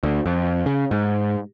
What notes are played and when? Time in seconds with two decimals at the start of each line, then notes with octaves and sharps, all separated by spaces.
0.03 D2
0.26 F2
0.66 C#3
0.91 G#2